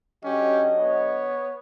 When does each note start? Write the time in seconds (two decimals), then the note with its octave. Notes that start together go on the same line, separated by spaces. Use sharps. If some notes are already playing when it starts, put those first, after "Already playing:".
0.24 D3 F#3 C#4 G4 D#5
0.78 B3 C#5